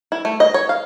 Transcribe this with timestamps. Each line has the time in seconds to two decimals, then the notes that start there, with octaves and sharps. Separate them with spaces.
0.12 E4
0.25 A3
0.40 D#5
0.54 C#5
0.69 F5